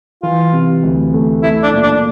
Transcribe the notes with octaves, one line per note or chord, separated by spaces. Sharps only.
E3 F4
C3
D2
A3
A3 E4
D4
A#2
D4